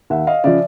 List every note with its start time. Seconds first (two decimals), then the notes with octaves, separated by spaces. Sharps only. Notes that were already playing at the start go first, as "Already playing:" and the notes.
0.10 D#2 E5 F#5
0.27 D#5 F5
0.44 C#3 F3 D5 E5